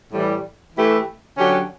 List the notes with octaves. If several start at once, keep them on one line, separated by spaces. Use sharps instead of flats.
A2 E3 G3
E3 A3 E4 G4 B4
D3 F#3 C#4 G4